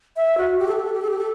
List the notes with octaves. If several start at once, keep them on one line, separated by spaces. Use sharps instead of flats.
E5
F#4
G4
A4
G4
A4
G4
A4
G4
A4